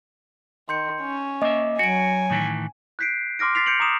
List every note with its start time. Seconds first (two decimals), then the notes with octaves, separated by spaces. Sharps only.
0.69 D#3 C6 G6 C#7
1.02 C#4
1.42 A#3 D#5 E5
1.79 F#3 F#4 G#5 C#7 D7
2.30 A2 D#3 E3
2.99 F#6 G6 B6 C7 D7
3.39 C6 D6 F6 A#6 D7
3.55 A6 B6 C7 F7
3.66 G6 C#7 D7 F7 F#7
3.80 A#5 D6 D#6 E7 F7